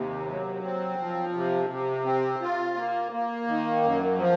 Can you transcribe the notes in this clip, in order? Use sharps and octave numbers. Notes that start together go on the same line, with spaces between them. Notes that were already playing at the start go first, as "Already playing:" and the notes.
Already playing: D#2 C3
F#3
C4
F3
C3
C3
C4
F4
A#3
A#3
D#3
F#2
F3